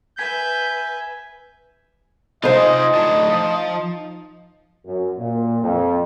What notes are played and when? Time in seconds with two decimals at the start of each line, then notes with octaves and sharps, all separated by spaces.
0.18 B4 E5 G#5 G6 G#6 B6
2.43 D#4 F4 C5 D#5 G#5
2.95 A2 D4
3.30 F3
4.85 F#2
5.17 A#2
5.62 F2